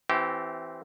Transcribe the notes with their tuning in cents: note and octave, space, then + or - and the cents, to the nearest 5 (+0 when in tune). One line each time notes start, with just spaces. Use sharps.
E3 +0 C4 +0 G4 -30